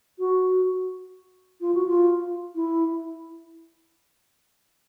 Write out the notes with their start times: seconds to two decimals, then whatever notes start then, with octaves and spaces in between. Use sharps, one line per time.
0.19 F#4
1.61 F4
1.75 F#4
1.87 F4
2.55 E4